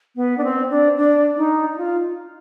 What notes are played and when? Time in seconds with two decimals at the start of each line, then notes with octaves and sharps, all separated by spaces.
0.16 B3
0.38 D4
0.44 C4
0.70 D4
0.97 D4
1.37 D#4
1.72 D#4
1.78 F4